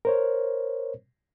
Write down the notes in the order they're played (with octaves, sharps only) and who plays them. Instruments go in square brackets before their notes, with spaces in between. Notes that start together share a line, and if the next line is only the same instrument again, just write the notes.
[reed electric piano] A#4 C5 C#5